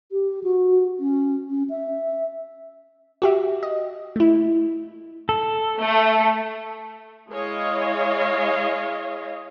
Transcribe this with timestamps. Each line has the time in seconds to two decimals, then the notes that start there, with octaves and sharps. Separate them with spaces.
0.12 G4
0.44 F#4
1.00 C#4
1.50 C#4
1.70 E5
3.22 F#4 G4 E5
3.63 D#5
4.16 A3 E4
5.29 A4
5.79 A3
7.30 G#3 E4 G#4 C#5 D#5 F5